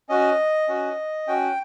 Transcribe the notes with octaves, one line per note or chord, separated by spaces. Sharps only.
C#4 F#4 D#5
C#4 F#4
C#4 F#4 G5